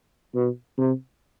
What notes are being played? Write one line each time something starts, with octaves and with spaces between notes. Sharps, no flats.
B2
C3